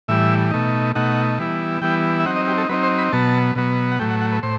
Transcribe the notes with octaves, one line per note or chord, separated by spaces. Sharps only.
A2 E3 G3 E5
B2 A3 D#4
B2 A3 D#4 F#5
E3 G3 B3 E4
E3 G3 B3 E4 G5
E5
F#3 C4 D#4 F#5
D#5
G4
A4
F#3 C4 D#4 B4
C5
B5
B2 F#3 B3 A5
B2 F#3 B3
F#5
A2 F#3 A3 G5
F#5
F#5
B4
A2 C5